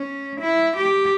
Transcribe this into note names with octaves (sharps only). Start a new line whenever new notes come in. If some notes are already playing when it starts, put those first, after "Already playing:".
Already playing: C#4
E4
G4